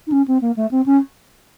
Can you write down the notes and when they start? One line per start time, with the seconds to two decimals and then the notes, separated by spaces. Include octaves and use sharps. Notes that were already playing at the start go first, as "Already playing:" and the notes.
0.07 D#4
0.12 C#4
0.28 C4
0.41 A#3
0.56 A3
0.71 C4
0.86 C#4